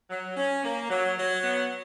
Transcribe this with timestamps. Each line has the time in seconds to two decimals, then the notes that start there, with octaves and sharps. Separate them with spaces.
0.10 F#3
0.37 C#4
0.64 A#3
0.90 F#3
1.17 F#3
1.43 B3